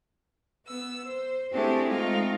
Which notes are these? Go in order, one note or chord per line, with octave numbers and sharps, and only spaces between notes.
B3 E6
C5
A3 C4 D4 E4 G4 G#4
G#3 A3 C4 D#4 F4